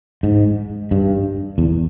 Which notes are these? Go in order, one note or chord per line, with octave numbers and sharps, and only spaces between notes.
G#2
G2
E2